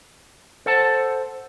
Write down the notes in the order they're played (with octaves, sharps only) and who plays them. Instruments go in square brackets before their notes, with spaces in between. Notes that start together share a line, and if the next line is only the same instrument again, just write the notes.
[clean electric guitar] A4 F#5 A5 [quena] C5